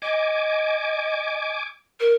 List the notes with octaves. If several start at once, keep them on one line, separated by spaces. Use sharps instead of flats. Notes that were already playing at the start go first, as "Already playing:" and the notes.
D#5 G#5 D6
A#4